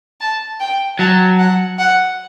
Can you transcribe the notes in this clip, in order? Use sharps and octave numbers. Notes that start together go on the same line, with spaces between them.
A5
G5
F#3 A5
F#5
F#5